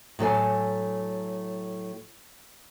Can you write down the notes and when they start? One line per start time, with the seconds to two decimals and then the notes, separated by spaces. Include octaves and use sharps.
0.19 A2 F#3 A4 G#5